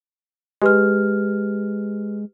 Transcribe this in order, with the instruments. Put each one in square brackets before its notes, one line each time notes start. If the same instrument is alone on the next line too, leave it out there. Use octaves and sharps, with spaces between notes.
[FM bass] G#3 [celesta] G4 B4 F6